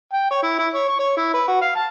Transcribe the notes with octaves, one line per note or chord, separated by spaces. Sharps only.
G5
C#5
E4
E4
C#5
C#6
C#5
E4
B4
F#4
F5
A5